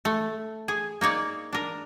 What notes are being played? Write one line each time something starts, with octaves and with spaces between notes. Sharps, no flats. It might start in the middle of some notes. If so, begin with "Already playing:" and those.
A3
G#4
A#3 D#4 C#5 D5
D4 A#4